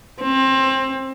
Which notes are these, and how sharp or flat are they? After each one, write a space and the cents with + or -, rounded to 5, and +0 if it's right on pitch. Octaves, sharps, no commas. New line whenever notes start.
C4 +25